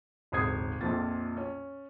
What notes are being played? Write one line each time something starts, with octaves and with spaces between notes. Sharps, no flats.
D#1 G#1 C#3 D#6 G#6 C7
A#1 F2 A#2 A6
C#4